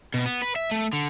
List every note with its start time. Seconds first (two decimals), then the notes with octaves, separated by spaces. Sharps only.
0.14 B2
0.26 B3
0.42 B4
0.56 E5
0.71 A3
0.93 D3